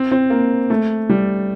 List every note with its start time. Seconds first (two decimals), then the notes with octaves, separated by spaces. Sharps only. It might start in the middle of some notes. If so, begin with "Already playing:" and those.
Already playing: C4
0.11 C4
0.30 A#3
0.70 A3
1.09 G3